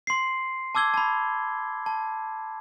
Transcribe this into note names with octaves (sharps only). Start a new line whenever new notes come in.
C6 C7
A5 D6 E6 G#6 G7
A5 B5
A5